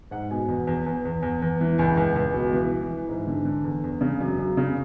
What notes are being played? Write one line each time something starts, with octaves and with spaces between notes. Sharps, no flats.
G#2 F#5
B2 G#5
E2
E2
E2
E2
E2
E2
E3
C#2 G#5
C#2
C#2
B2
E3
E3
E3
G#2
D3
D3
E2
E2
C#3
F#2
F#2
C#3